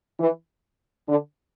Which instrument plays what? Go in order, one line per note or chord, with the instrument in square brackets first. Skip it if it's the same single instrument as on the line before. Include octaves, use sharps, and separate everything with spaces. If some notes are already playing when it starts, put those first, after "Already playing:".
[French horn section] E3
D3